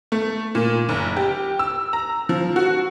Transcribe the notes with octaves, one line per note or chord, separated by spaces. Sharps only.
A3
A#2
F#1
G4
E6
A#5
F3
F#4